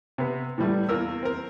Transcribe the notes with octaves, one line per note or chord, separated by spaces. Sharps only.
C3 B3
A2 E3 G3 A3
E2 A#3 A#4 E6
C4 A#4